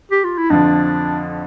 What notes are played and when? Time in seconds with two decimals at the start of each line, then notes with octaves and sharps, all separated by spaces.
0.11 G4
0.24 F4
0.38 E4
0.50 F2 D3 F3 D4